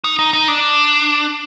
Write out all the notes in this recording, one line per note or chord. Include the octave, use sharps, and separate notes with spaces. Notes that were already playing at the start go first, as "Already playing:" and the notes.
D#4
D#4
D#4
D4